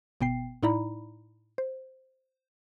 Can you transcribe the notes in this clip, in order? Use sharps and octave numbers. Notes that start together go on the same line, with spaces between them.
G1 B2 B3 G5 C7
A2 D#4 E4 D5 A#5 B5
C5